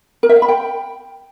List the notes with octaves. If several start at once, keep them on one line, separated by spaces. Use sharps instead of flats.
A#4
E5
F5
B5
G5